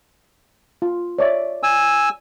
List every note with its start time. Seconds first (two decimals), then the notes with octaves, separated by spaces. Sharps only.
0.82 F4
1.19 C#5 D5 E5
1.63 G#5 E6